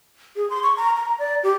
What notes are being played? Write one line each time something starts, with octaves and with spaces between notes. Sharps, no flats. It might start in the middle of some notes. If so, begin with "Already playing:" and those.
G#4
C6
C#6
A#5
A#5
D5
G4